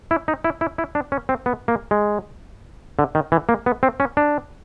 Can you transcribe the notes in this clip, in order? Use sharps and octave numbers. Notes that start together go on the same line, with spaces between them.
E4
D#4
E4
E4
E4
D4
C#4
C4
B3
A#3
G#3
D3
D#3
E3
A#3
B3
C4
C#4
D4